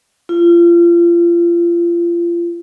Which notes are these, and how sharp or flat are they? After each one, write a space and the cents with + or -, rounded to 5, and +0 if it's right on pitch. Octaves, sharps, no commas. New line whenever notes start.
F4 -30